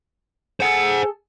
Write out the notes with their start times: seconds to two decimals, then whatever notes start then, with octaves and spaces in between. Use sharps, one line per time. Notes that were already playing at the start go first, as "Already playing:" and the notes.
0.60 G#4 A4 C5 F#5